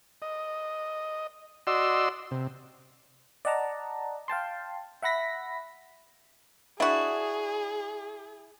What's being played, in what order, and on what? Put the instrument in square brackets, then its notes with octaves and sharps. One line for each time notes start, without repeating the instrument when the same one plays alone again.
[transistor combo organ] D#5
F#4 D5 D#5 C6 E6
C3
[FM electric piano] D5 D#5 F#5 A5 A#5
F5 G5 A5 C6
E5 F#5 B5 A#6 B6
[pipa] D4 F#4 [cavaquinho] E4 E5 D#6 [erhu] G#4